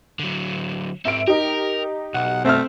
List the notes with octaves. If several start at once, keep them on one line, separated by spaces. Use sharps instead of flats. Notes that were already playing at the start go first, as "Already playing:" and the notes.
D3 F#3
G#2 C4 E5 D7
D#4 G4 A#4
B1 F#5
A3 C4 E5 F6